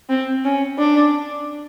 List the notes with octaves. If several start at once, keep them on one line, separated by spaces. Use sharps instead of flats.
C4
C#4
D4